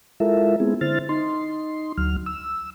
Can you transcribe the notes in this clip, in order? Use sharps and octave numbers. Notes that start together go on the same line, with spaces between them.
G#3 E4 F4 A4 A#4 E5
G#3 B3 C4 E4 G#4
D3 E4 C5 F6 A6
D#4 C6
D2 F#3 F6
E6